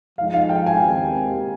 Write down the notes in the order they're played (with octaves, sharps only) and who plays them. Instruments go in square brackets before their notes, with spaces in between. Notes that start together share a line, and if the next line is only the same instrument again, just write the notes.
[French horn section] F3 G#3 D#4 [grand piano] F5
[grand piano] F5
G5
G#5
[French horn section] D#2 D#3 G#3 C4 G4